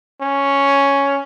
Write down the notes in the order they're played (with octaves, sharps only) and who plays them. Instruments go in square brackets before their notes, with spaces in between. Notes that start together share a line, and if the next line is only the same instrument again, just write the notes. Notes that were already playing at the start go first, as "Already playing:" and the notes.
[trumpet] C#4